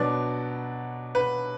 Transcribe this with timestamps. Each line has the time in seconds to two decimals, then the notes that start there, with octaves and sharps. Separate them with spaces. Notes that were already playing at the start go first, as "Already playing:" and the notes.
Already playing: B2 F#3 B3 D4 D5
1.15 B4